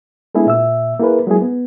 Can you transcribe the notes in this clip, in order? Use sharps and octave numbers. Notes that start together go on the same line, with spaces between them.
G#3 A3 B3 D4 E4 G#4
A#2 E5 E6
A#3 E4 G#4 A#4 B4
F#3 G#3 A#3 E4 G#4
B3